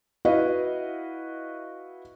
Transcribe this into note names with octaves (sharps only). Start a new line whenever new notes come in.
E4 F#4 B4 D#5 F5